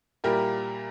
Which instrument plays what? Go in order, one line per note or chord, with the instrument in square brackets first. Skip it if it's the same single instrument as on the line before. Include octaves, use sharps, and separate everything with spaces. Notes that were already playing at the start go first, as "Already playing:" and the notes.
[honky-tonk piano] A#2 G3 A#3 E4 [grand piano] G4 A#4